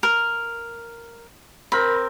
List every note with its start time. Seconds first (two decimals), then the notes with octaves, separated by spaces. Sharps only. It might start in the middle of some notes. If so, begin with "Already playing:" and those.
0.03 A#4
1.72 C4 A#4 B5